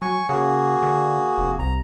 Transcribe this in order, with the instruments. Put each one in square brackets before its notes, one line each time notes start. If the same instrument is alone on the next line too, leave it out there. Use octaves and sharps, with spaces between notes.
[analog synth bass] F#3 [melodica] G#5 C#6
[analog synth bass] C#3 [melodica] A#3 F#4 G#4
[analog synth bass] D3
F1
[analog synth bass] C2 [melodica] A#5